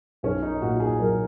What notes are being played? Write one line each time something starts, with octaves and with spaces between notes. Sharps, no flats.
B1 C#4
D#4
A#2 F#4
G#4
F#3 A#4